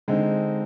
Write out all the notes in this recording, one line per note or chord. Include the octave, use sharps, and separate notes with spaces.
D3 G#3 C4 D#4